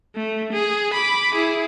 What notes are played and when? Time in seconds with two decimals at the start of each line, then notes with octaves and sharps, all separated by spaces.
0.16 A3
0.53 G#4
0.94 B5 D6
1.35 E4 G#4